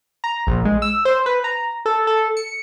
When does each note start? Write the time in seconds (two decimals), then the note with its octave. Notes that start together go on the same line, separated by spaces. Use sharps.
0.24 A#5
0.47 A#1
0.65 G#3
0.82 E6
1.05 C5
1.26 B4
1.44 A#5
1.86 A4
2.07 A4
2.37 C#7